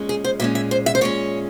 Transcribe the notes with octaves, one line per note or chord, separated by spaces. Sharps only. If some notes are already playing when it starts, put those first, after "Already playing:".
Already playing: A#2 G#3 C#4
G#4
C5
A#2 G#3 C#4 E5
E5
C5
E5
C5
A#2 G#3 C#4 C#5